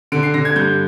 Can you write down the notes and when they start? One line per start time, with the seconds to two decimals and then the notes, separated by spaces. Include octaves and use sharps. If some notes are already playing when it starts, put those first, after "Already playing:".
0.12 D3 D7
0.23 C7
0.34 D3 A#6
0.45 G#6
0.56 G2 G6